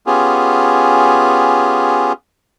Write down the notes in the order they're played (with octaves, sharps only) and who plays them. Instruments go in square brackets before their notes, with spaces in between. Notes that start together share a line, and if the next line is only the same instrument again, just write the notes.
[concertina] B3 C#4 F4 G4 G#4